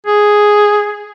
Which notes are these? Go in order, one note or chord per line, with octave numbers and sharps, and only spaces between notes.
G#4